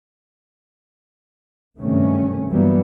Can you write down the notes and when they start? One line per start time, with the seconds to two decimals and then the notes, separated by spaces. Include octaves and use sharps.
1.77 F#1 G2 C3 D#3 A3 C#4
2.50 G2 E3 F#3 G3 A#3 B3